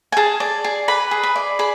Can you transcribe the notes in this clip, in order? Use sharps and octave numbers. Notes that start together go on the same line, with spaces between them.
G#5
G#4 A5
D5
G#4
B4 B5
G#4
B5
D5
G#4 B5